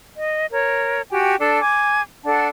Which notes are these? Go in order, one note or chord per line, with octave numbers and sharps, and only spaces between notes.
D#5
A#4 C#5
F#4 G4 G5 G#5
D4 A4
G#5 D6
D4 A4 F#5 A5